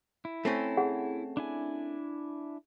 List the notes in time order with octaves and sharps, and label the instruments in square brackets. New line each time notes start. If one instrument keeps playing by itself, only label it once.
[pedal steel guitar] E4
[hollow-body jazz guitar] A3 C4 C#4
[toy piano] G#4 F#5
[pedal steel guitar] D4 E4 G#5